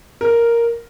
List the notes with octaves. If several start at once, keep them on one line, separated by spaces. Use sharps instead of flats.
A#4